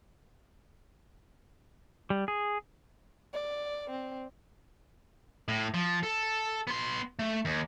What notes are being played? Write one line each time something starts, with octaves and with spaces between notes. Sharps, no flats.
G3
G#4
D5
C4
A2
F3
A4
B3 C6
A3
D#2